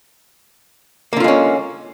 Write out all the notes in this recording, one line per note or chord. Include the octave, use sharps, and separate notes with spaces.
D3 G#3 A#3 C#4 F4